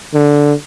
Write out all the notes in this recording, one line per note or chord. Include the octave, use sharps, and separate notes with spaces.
D3